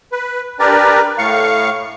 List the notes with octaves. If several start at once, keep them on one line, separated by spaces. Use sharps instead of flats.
B4
D4 G4 A#4 B4 D5
A2 F5 C#6